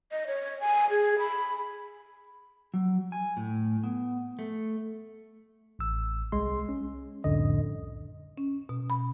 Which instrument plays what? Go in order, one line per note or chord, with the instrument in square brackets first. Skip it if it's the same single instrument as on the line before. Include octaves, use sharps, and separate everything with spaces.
[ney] D#5
C#5
G#5
G#4
B5
[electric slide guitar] F#3
G#5
A2
B3
A3
[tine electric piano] A1 E6
C2 G#3 C6
C#4
C2 F2 A2 D3 D#5
[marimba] C#4
B2
B5